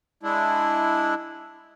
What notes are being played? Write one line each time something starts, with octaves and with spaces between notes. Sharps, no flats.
G#3 D4 E4